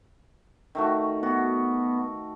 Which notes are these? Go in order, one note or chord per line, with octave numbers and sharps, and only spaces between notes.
D#3 A3 F#4
B3 F#4